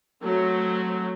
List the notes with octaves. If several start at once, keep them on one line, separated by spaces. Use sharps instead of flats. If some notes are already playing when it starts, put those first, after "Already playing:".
F#3 A3 C4